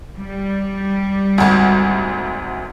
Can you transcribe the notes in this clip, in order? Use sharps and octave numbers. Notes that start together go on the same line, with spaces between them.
G3
G#1 D2